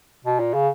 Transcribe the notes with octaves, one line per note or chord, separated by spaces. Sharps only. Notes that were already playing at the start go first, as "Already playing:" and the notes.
B2
A#2
C#3